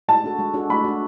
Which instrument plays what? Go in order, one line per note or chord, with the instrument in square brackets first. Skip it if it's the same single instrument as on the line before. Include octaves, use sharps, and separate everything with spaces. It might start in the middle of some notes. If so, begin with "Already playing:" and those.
[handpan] G#3 [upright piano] A5
[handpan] D4 F#4 A4
G#3
D4 F#4 A4
[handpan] A3 [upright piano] B5
[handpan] D4 F#4